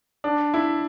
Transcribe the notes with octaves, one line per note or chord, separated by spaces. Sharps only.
D4
E4